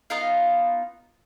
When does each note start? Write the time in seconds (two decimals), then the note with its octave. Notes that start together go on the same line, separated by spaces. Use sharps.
0.10 B3 D#4 F4 F5